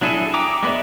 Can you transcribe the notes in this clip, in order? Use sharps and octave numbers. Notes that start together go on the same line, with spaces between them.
F#3 D4 E4 G#4 A4
G5 A#5 D6 D#6
G#3 B3 B4 D5 E5